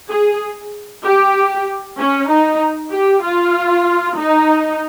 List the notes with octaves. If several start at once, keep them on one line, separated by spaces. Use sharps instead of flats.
G#4
G4
C#4
D#4
G4
F4
D#4